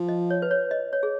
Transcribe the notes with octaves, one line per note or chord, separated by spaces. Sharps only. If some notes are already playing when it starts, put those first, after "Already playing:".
Already playing: F3
D#5
C#5
B4
C#5
D#5
C#5
G#4